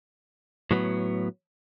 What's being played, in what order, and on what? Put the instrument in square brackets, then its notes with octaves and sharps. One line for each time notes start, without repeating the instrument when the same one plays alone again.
[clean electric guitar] A2 F#3 B3